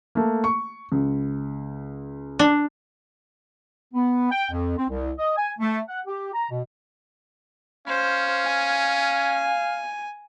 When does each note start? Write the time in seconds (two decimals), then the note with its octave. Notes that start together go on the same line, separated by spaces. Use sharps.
0.15 A3 A#3
0.44 C#6
0.92 C#2
2.39 D4
3.94 B3
4.31 G5
4.51 F2
4.77 C4
4.89 C2
5.18 D#5
5.36 G#5
5.59 A3
5.88 F#5
6.06 G4
6.33 A#5
6.50 B2
7.87 C#4 C5 F5
8.44 G#5